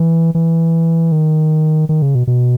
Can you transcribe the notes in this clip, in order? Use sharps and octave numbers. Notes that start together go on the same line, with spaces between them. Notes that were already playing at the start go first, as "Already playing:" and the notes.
Already playing: E3
E3
D#3
D#3
C#3
B2
B2